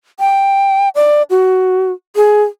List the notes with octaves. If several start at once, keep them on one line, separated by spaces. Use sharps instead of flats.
G5
D5
F#4
G#4